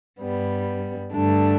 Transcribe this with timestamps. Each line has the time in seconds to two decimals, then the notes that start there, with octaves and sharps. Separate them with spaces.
0.20 G2 G3 B3
1.13 G2 D3 A3 D4